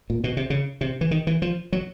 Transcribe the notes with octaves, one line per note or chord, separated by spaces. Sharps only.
A#2
B2
C3
C#3
C3
E3
D#3
E3
F3
F#3